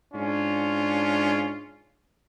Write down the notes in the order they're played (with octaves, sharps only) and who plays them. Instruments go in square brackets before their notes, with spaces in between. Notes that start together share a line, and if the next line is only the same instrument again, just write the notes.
[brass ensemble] G#2 C#4 D4 F4